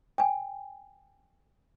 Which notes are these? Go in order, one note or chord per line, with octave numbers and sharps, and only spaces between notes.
G5 G#5